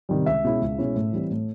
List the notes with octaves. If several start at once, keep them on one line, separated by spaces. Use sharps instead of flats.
C3 D#3 G3
C#2 E5
B2 G#3 C#4 E4
C#2
B2 G#3 C#4 E4
A2
E3 G3 C4
A2